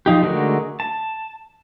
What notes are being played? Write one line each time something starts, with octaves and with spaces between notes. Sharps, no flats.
F3 D#4 G4
D3 G#3 A3 F#4 A#4
A5